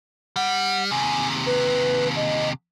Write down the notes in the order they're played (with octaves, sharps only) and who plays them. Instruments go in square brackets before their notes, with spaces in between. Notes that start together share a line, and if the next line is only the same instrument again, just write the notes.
[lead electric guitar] G3 [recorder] F#5
[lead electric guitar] D#2 C3 [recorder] G#5
[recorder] B4
D#5